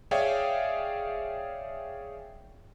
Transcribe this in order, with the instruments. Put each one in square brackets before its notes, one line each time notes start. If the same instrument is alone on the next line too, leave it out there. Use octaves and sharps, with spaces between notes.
[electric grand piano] G#4 C#5 D5 E5 F5 G5